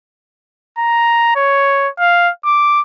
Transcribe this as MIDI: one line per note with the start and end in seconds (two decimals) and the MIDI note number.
0.78 1.34 82
1.36 1.88 73
1.99 2.30 77
2.45 2.81 86